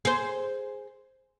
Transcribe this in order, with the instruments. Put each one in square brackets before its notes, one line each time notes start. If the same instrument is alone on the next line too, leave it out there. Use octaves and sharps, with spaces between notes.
[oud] G#4 C5